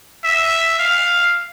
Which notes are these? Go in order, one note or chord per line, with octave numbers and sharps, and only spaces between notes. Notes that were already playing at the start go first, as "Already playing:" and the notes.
E5
F5